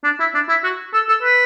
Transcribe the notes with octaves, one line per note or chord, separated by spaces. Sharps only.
D4
E4
D4
E4
F#4
A4
A4
B4